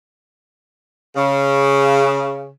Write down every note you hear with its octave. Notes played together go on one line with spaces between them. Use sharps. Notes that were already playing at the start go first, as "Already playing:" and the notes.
C#3